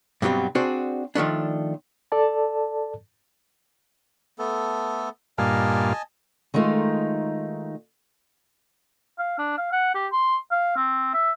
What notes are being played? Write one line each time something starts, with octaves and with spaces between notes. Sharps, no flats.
G2 B2 F#3 G3 C4
C4 D4 F#4 G#4 C5
D#3 F3 A3 D4
A4 D5 A5
A3 B3 A4
G2 A#2 F4 D#5 G#5 A5
D#3 G#3 A3 D#4 F4
F5
D4
F5
F#5
G4
C6
F5
C4
E5